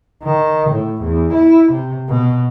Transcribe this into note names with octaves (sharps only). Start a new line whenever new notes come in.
D#3
A2
E2
E4
C3
B2